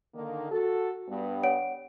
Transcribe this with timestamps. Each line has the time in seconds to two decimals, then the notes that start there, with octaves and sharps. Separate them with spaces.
0.15 D3 D#3 A#3
0.51 F#4 A4
1.09 G2 G3 B3
1.43 C#5 F#5 D7